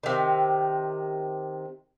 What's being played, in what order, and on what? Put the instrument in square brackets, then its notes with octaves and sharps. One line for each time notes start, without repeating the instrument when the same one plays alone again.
[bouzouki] C3 D#3